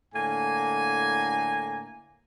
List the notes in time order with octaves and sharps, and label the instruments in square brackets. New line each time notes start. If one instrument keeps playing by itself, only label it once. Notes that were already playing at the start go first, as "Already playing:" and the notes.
[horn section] A2 D3 A#3 G#5